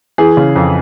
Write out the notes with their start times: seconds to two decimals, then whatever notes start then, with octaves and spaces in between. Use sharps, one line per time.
0.18 E3 G#4
0.37 C#3
0.56 F2